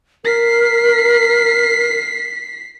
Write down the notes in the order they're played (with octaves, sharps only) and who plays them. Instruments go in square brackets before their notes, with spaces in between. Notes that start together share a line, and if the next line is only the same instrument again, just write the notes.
[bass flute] A#4 [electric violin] B6 C7